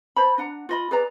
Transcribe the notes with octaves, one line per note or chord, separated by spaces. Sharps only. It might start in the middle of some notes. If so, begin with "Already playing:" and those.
C5 A5 B5
D4 F#5 A#5
F4 D#5 B5
G#4 B4 D5 A#5